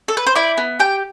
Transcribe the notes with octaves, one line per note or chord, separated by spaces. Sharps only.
A4
B4
C5
E4 D5
B3
G4 G5